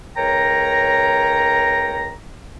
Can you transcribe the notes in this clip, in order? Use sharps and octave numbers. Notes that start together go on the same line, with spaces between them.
C#2 A#4 C#5 G5 A#5